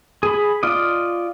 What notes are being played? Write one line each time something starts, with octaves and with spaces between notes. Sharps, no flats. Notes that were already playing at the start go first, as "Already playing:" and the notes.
G#4 B5
F4 D5 D#5